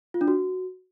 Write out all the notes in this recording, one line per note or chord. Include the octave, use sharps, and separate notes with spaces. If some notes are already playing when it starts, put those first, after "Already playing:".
F4
D4
F#4